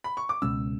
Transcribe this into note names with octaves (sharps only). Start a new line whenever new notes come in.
B5
C#6
D6
C#2 B2 G#3 C#4 E6